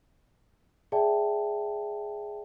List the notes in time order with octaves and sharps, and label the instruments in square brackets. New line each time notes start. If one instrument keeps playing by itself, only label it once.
[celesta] G#4 D5 E5 G5 A5